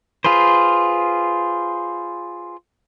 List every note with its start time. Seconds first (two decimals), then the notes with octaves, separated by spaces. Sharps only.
0.24 F4 G#4 B4 C5